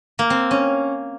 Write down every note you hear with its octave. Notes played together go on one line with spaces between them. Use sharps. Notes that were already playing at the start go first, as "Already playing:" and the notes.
A#3
C4
C#4